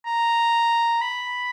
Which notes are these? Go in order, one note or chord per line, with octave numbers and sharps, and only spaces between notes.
A#5
B5